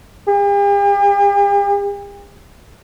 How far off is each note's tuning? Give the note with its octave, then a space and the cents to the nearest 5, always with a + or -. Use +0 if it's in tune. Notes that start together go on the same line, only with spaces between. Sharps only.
G4 +45